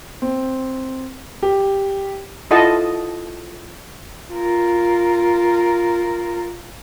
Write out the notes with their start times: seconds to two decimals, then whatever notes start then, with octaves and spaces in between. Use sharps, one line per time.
0.22 C4
1.43 G4
2.51 E4 F4 A4 D#5 F#5 A5
4.33 F4 A#4